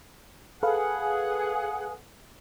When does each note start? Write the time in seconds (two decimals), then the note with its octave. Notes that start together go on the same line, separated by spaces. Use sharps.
0.63 G#4 A4 B4 F5 F#5